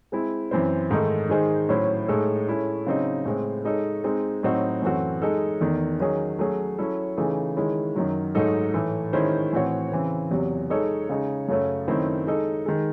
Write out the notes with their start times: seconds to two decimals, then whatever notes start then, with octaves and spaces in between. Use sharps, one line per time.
0.12 G#3 C4 E4
0.51 F#2 E3 C4 E4 C5
0.91 G#2 D#3 A3 D#4 A4
1.29 D#3 G#3 D#4 G#4 C5
1.69 A2 F#3 C#4 E4 C5
2.08 A2 G#3 D#4 A4
2.47 G#3 C#4 E4 A4
2.87 C#3 F#3 C4 D#4
3.25 A2 G#3 C4
3.65 G#3 D#4 A4 C#5
4.04 G#3 C4 D#4
4.43 A2 F#3 C4 D#4 F#4
4.82 F#2 E3 A3 C4 F#4
5.22 G#3 D#4 A4
5.61 E2 D#3 A3
6.00 D#3 F#3 C#4 G#4
6.39 F#3 A3 C#4 G#4
6.78 F#3 C#4 E4 A4
7.17 C#3 E3 A3 D#4 G#4
7.57 D#3 G#3 C#4 E4
7.96 F#2 D#3 F#3
8.35 G#2 F#3 A3 D#4 A4
8.74 A2 E3 A3
9.13 D#3 G#3 C#4 E4 C5
9.53 A2 E3 C4 F#4 C#5
9.92 C#3 E3 C4
10.31 E2 C3 F#3
10.70 G#3 D#4 A4 C#5
11.09 C#3 G#3 D#4 G#4 C#5
11.48 F#2 C#3 F#3 A3 C#4
11.88 F#2 D#3 A3 C4 E4
12.27 G#3 D#4 A4
12.66 D#3 G#3